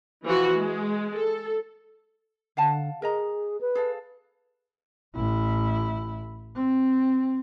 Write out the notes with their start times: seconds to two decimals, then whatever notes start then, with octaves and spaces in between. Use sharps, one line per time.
0.25 E3 F3 F#4
0.56 G#3
1.14 A4
2.57 D3 F5 F#5 A5
3.02 G#4 A#4 D#5 A#5
3.61 B4
3.75 G#4 A4 F5
5.15 A1 E4
6.55 C4